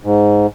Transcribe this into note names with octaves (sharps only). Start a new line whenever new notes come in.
G#2